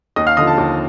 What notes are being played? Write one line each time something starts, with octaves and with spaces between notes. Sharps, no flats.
D#2 D#5 D#6
F5 F6
D3 F3 D#5 D#6
A4 A5
D#2